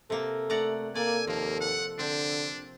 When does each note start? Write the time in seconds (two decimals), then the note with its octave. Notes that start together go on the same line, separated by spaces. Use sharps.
0.10 C3 A#3 A4
0.50 A3 D5 F#5 A#5
0.95 A#3 A4 D5 G#5
1.27 D#2 F3 A#3
1.61 F#5
1.99 D3 C4 D4